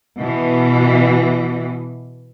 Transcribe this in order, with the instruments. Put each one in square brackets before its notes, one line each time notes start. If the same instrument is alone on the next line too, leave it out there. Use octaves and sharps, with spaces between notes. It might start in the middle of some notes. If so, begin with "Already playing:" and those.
[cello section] B2 E3